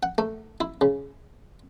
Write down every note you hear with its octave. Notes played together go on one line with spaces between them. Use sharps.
F#5
A3
E4
C#3